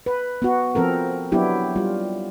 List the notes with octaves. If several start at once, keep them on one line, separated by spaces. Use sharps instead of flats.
B4
B3 F#4
F3 C4 A4 A#4
F#3 B3 D4 E4 G4
G3 F4